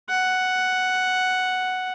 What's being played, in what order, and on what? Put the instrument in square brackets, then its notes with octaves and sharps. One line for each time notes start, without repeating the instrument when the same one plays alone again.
[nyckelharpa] F#5